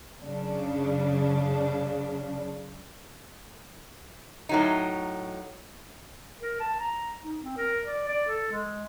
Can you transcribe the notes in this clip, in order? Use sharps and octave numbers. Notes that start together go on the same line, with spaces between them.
F#2 C#3 D4
A2 F#3 D#4
A#4
A5
A#5
D#4
C4
A#4
D5
D5
A4
G#3